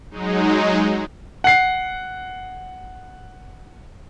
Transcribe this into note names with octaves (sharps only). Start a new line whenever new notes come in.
F#3 G#3 D#4
F#5 C7